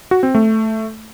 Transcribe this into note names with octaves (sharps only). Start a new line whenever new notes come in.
F#4
C4
A3